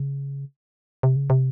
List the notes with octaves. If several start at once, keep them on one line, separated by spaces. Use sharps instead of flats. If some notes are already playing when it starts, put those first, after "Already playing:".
Already playing: C#3
C3
C#3
C3